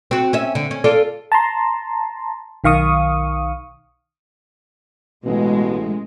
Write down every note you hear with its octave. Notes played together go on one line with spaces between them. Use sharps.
C4 F#4
C#4 E5
D3
C#4
F4 A4 D5
A5 A#5 C6
B1 D#3 F5 C#6 D#6
A1 B2 G#3